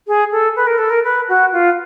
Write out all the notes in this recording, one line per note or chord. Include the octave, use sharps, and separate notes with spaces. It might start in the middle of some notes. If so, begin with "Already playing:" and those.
G#4
A4
B4
A#4
A4
A#4
B4
F#4
F4